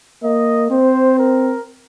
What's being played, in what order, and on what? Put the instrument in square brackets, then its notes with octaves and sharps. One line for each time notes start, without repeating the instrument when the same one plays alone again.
[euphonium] A#3 [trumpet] D#5
[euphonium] C4 [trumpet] C5
[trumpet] A#4